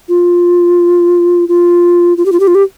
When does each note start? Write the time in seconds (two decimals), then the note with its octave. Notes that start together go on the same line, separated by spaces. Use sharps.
0.09 F4
1.48 F4
2.17 F4
2.26 G4
2.32 F4
2.40 G4
2.47 F4
2.55 G4